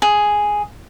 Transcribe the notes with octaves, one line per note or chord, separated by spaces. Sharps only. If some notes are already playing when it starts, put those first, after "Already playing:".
G#4